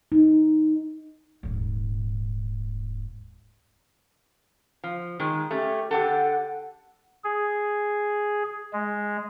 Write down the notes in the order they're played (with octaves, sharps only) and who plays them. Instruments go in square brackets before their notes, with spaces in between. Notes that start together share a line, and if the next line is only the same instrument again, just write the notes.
[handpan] D#4
[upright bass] D#1 G#2
[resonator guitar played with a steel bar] F3
D#3 G#3
[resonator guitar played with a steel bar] A3 C#4 [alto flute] G4
[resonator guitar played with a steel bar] D3 G4 A4 [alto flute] F#5
[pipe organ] G#4
G#3